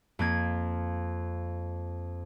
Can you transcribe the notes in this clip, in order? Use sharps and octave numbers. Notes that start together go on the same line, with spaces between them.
F2 A#3 G#6